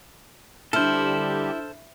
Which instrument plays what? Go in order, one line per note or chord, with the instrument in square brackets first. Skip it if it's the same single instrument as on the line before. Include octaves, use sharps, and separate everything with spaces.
[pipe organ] D3 G3 G4 [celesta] D4 F6 [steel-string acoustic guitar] E4 [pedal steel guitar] A4 C5